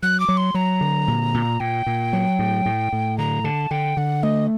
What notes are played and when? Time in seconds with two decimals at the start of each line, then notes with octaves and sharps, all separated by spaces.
0.02 F#3 F#6
0.20 D6
0.28 F#3
0.37 C6
0.54 F#3 A#5
0.81 D3
1.08 A#2
1.34 A#2
1.60 A#2 G5
1.87 A#2
2.13 F#3
2.39 A2
2.66 A2
2.93 A2
3.18 D3 A#5
3.44 D3 A5
3.71 D3 G5
3.97 D3 F#5
4.23 A3 D#5